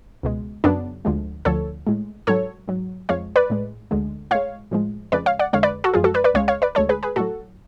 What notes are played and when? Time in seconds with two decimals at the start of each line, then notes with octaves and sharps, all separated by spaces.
0.23 C#2 B2 G#3
0.64 F#2 C#3 F#3 B3 D4
1.05 D2 D3 F3 G#3
1.45 D2 D3 F3 A4 C#5
1.87 A2 G#3
2.27 G#2 F#3 A4 C#5
2.68 G#2 F#3
3.09 F2 F3 G#3 C#5 F5
3.36 B4 D5
3.50 A2 G#3
3.91 D2 D3 G#3
4.31 A2 G#3 C#5 F5
4.71 A2 F3 G#3
5.12 F2 C#3 G#3 B4 D5
5.26 C#5 F5
5.39 D5 F#5
5.53 F2 D3 G#3 C#5 F5
5.63 B4 D5
5.84 F#4 A4
5.94 F#2 F3 G#3 F4 G#4
6.04 F#4 A4
6.14 B4 D5
6.24 B4 D5
6.34 C#2 C#3 G#3 C#5 F5
6.48 C#5 F5
6.62 B4 D5
6.75 D2 D3 G#3 A4 C#5
6.89 G#4 B4
7.03 G#4 B4
7.16 A2 F#3 F#4 A4